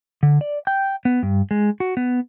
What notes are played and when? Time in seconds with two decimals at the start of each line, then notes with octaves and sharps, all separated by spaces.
0.23 D3
0.41 D5
0.67 G5
1.05 B3
1.23 G2
1.51 G#3
1.80 F#4
1.97 B3